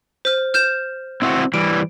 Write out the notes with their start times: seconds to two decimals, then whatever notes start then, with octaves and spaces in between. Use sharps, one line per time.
0.25 C5 F6
0.54 F6 G6 E7
1.22 C4 E4 F#4
1.54 E3 G3 D7